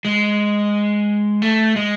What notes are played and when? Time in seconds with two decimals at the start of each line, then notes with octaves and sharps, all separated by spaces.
0.05 G#3
1.42 A3
1.76 G#3